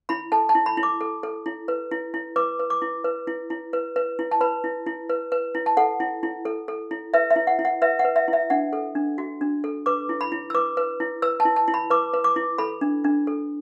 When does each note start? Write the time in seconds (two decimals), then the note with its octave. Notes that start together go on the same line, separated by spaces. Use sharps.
0.09 E4 B5
0.32 A4 A5
0.49 A5
0.55 E4
0.66 B5
0.77 E4
0.83 D6
1.01 A4
1.23 A4
1.46 E4
1.68 B4
1.91 E4
2.14 E4
2.36 B4 D6
2.59 B4
2.70 D6
2.82 E4
3.04 B4
3.27 E4
3.50 E4
3.73 B4
3.96 B4
4.19 E4
4.31 A5
4.41 B4 B5
4.64 E4
4.86 E4
5.09 B4
5.32 B4
5.55 E4
5.66 A5
5.77 A4 F#5
6.00 E4
6.23 E4
6.45 A4
6.68 A4
6.91 E4
7.14 B4 E5
7.31 E5
7.36 E4
7.47 F#5
7.59 E4
7.65 F#5
7.82 B4 E5
7.99 F#5
8.05 B4
8.16 E5
8.28 E4
8.33 E5
8.50 D4 F#5
8.73 A4
8.95 D4
9.18 F#4
9.41 D4
9.64 A4
9.86 B4 D6
10.09 E4
10.21 B5
10.32 E4
10.50 E6
10.54 B4 D6
10.77 B4
11.00 E4
11.22 B4 E6
11.40 A5
11.45 E4
11.56 A5
11.68 E4
11.74 B5
11.90 B4 D6
12.14 B4
12.24 D6
12.36 E4
12.58 A4 B5
12.81 D4
13.04 D4
13.27 A4